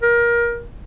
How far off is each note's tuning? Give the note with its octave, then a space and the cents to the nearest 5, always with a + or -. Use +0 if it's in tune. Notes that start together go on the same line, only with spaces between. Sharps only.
A#4 +20